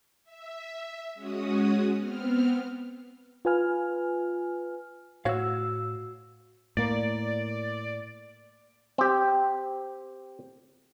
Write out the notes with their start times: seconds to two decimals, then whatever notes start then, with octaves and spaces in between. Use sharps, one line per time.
0.24 E5
1.15 G#3 C#4 F#4 D#6
1.97 B3 C4 F6
3.45 F4 B4 G#5 F6
5.25 A2 F#4 C#5 F5 E6
6.77 A2 A#3 D5
8.98 C4 G4